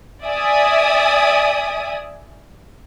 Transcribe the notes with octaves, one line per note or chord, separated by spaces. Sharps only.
D5 E5 G#5 D#6